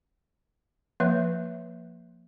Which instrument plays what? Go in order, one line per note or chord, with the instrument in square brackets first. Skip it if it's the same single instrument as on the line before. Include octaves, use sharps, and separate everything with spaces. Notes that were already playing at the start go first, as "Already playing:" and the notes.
[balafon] F3 A#3 B4 E5